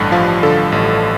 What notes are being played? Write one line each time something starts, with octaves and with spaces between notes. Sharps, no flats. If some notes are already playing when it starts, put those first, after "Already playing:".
Already playing: A1 G2 D3 A5
F3 F5
D3 A4
A1